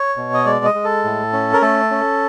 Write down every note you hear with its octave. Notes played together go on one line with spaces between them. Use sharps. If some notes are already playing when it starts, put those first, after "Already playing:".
Already playing: C#5
B2
D#5
G#3 D5
D#5
G#3
A4
A2
C#4
A#4
A3 A4
C#4